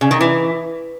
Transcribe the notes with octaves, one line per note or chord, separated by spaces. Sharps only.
C#3
D#3
E3